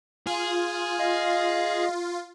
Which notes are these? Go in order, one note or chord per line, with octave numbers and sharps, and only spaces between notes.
F4 G#4
D#5 F5